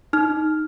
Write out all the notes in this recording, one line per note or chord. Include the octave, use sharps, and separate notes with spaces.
D#4 F6